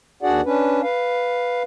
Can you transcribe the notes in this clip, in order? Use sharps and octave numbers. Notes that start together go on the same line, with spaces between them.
D#2 D4 F#4 G#4 D5 F#5
C#4 D4 B4
B4 F5